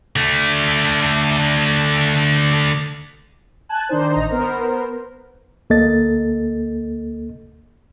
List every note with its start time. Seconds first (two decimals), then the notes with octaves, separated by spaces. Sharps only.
0.16 D3 A3
3.69 G#5 A5 F#6
3.89 D#3 D4 D#4 C5
4.13 A1 D#4 A#5
4.30 B3 A#4 C5
5.70 D2 A#3 A4 D#5 A6